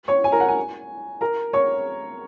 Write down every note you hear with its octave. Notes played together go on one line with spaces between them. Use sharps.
C#5 C#6
G#5
A#4 A#5
F#5
G#5
A#4 A#5
C#5 C#6